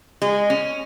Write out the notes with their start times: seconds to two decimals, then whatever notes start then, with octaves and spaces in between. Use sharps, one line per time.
0.22 G#3
0.50 C#4